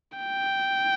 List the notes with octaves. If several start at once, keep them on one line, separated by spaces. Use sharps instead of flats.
G5